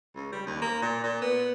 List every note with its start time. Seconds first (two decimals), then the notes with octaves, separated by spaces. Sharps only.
0.15 C#2
0.32 G3
0.46 D#2
0.61 A#3
0.82 A#2
1.03 A#2
1.22 B3